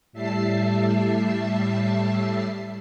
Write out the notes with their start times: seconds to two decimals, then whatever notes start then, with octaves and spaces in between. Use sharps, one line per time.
0.13 A2 G3 E5 A5 C7